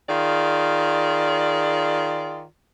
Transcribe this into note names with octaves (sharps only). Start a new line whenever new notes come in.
D#3 F4 G#4 D5